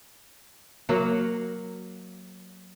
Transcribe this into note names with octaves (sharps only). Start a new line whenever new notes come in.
F#3 A#3 F5 F#5